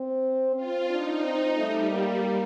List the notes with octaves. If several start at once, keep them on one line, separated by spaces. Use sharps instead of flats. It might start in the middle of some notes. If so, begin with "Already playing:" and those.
Already playing: C4
C4 F4
D4 D#4
C4
G3 A3
A#3